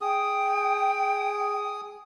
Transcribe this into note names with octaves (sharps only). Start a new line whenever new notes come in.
G#4 G5 D#6